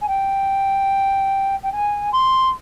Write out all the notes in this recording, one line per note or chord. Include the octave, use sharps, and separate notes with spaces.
G#5
G5
G5
G#5
C6